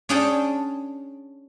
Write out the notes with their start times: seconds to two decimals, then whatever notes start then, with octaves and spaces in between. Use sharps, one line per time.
0.09 C#4 D4 G#4 C#5 G5 A5